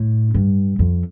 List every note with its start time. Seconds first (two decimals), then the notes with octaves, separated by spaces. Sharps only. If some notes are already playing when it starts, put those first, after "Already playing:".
Already playing: A2
0.34 G2
0.79 F2